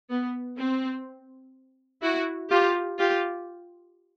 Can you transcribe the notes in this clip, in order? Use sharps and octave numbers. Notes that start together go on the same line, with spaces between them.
B3
C4
E4 F#4
F4 G4
F4 G4